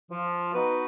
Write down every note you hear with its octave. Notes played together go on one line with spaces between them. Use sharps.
F3
B3 D#4 F#4 B4